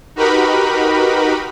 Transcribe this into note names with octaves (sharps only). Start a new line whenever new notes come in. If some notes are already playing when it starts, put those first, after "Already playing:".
D#4 F#4 G4 A#4 B4 B5